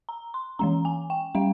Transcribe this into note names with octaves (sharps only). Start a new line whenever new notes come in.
A#5
C6
E3 G#3 C#4 A#5
G#5
G5
G3 C#4 F5